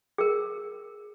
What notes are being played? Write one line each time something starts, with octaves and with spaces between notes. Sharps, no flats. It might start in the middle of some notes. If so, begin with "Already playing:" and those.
G#4 A#4